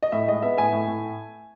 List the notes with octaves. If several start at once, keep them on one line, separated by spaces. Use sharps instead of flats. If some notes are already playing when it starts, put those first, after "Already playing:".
D#5
A2 E5
G#3 D#5
B3 E5
A2 E5 G#5
A2
A2